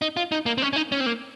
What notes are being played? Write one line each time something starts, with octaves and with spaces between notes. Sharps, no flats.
D#4
F4
D#4
A#3
C4
C#4
C#4
D#4
C#4
C4
A#3